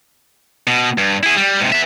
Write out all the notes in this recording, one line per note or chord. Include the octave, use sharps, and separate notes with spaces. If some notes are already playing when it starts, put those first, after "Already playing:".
B2
G2
E4 G#4
G3
G#2 C3
B3 E5